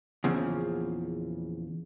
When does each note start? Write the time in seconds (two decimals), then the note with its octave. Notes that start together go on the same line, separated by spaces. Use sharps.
0.24 E2 A#2 C#3 F3